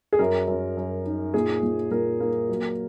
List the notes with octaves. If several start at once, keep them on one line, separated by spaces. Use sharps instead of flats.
G#4
F#2 A#4
F#2
F#2
D#4
A#2 G#4
A#2
A#2 A#4
A#3
F#3